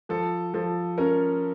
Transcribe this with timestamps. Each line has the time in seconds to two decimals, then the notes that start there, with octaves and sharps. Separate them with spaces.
0.09 F3 A4
0.54 F3 A4
0.98 C#4 A#4